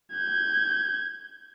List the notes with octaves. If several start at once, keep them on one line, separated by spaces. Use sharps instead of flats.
G6 G#6